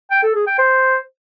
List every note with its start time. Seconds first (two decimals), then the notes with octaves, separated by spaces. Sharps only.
0.11 G5
0.23 A4
0.35 G#4
0.47 G5
0.58 C5